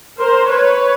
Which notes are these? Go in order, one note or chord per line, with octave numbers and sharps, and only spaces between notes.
A#4 C5
B4 C#5